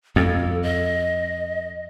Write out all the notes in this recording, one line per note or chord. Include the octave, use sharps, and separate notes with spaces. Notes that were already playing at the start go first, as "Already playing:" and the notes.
F2 A4
D#5